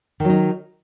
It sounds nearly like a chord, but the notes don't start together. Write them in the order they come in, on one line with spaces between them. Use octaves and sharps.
D#3 F#3 D#4